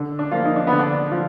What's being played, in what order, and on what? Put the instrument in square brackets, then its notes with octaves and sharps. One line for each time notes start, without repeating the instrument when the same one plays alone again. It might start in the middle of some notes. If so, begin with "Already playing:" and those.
Already playing: [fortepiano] D3
[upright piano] D4
[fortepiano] F3 A#3 F4
[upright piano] D#4
D4
[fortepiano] D3 [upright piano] B3
[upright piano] D4
[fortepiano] F3